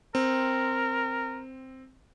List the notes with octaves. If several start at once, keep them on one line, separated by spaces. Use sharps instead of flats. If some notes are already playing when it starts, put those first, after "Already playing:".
C4 A#4